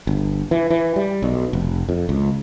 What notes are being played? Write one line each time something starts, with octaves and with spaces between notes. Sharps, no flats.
G1
E3
E3
G3
B1
F1
F2
C#2